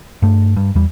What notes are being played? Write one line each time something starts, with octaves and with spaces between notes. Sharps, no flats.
G2 A3
G2
E2 G3